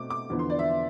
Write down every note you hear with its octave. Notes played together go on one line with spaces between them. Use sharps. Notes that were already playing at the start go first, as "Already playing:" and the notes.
Already playing: B2 A3 C4 D6
D6
E2 D3 F3 B3
C6
D5
E5